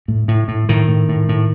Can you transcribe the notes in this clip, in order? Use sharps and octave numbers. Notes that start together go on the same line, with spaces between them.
A2
A2
A2
A2 D#3
A2
A2
A2